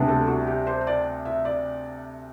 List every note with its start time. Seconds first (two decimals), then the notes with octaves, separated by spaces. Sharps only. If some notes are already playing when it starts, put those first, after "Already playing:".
Already playing: D2 C3 G3 B3 D4
0.08 A4
0.27 F#4
0.47 G4
0.67 C5
0.87 D5
1.25 E5
1.45 D5